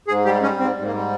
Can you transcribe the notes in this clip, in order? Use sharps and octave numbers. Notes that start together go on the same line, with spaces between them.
G#2 G#4
G3 G4
G3 C#4
G#2 C4
G#2
A#3
G3